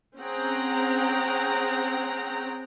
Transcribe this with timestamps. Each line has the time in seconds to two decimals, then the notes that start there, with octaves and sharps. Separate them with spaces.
0.18 C4 C#4 G#4 F#5 G5 A#5